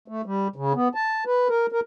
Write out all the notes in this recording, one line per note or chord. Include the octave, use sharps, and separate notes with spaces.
A3
G3
C#3
B3
A5
B4
A#4
A#4